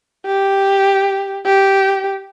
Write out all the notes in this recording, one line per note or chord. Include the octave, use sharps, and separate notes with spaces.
G4
G4